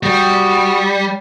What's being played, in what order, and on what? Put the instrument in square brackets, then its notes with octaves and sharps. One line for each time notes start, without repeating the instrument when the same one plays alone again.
[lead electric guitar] G3 [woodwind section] F#4 D#6